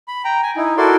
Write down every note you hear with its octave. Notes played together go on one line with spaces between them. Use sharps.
B5
G5 A#5
G#5
D#4 E4
E4 F#4 A4 A#4 D5 C6